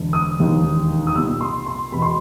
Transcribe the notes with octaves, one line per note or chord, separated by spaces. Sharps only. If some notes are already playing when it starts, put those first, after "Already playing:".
Already playing: E1 D3
D#6
E1 D#2 D#3
D#6
C2 A#2 E6
C6
C6
E1 E2 B2 B5
C6